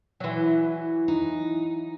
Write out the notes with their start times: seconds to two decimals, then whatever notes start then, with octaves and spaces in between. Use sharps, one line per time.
0.20 E3 F#3
1.08 D#4